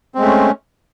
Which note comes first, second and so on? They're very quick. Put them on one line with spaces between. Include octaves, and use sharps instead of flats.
C4 G#3 A3 C#4